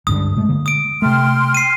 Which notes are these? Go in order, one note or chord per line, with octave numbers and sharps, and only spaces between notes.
C#2 G2 D3 D#6
B2 G#3 A3
D3 A#3
D#6 D7
C3 A3 G5 C6 F6
C7 D#7